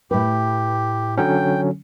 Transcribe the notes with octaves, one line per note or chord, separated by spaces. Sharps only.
A2 G4 B4
D3 F#3 C#4 G5